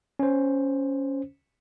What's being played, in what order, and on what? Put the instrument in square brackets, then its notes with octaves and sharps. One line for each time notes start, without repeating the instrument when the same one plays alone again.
[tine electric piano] C#4 C5